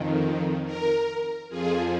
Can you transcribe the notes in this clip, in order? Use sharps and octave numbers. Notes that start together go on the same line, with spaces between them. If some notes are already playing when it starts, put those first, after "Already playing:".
Already playing: F2 D#3
A#4
F2 F3 G#4